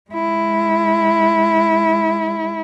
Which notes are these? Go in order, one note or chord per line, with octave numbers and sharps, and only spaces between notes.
G#3 E4